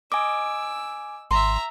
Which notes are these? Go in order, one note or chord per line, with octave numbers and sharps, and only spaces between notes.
D#5 G#5 D6 E6
G#1 E5 A#5 C6